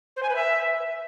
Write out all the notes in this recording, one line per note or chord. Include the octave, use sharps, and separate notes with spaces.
C5
G#5
B4
E5